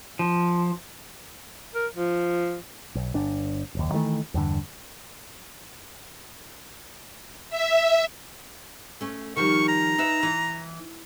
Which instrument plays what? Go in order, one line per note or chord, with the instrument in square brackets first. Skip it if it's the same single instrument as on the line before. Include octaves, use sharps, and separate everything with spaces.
[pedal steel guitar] F3
[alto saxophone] A#4
F3
[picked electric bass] B1
G1 D4
F#1 D#2
D#3 E3 G3 A3
E2 G2 D3
[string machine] E5
[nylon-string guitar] A3 C#4
[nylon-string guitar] D#3 F3 G3 [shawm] C#6
[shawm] A#5
[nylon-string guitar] D#4 B4 E5
E3